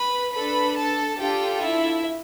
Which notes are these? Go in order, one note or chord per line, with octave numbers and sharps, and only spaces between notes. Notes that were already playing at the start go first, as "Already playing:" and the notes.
Already playing: B4 B5
D4 A4 B4 B5
A4 A5
D4 F4 G4 A4 G5
E4 E5